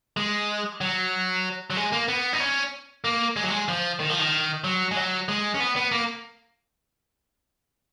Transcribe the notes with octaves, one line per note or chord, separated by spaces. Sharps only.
G#3
F#3
F#3
G#3
A#3
B3
D#4
C#4
A#3
G#3
F#3
G#3
F3
D#3
F3
D#3
F#3
G#3
F#3
G#3
C#4
B3
B3
A#3